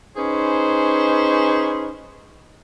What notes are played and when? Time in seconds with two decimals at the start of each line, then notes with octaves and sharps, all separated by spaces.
0.16 C#4 D#4 G#4 B4 C5